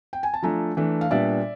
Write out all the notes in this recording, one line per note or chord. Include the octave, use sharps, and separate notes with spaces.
G5
G#5
A5
F3 A3 D4 G#5 A#5
E3 A3 D4
F5
A#2 G3 B3 D4 D5 E5